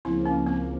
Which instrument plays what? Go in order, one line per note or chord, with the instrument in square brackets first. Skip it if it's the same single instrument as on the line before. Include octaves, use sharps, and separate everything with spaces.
[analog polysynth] C#2 C#3 F3 A#3 [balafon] C4 E4
[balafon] C#4
C4